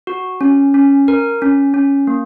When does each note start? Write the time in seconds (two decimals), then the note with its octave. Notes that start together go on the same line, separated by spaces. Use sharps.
0.07 F#4
0.41 C#4
0.74 C#4
1.08 A#4
1.42 C#4
1.74 C#4
2.07 A#3